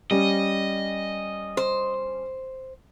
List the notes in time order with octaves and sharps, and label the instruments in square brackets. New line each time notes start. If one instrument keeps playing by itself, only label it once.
[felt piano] G3 C#4 [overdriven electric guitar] D#5
[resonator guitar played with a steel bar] C5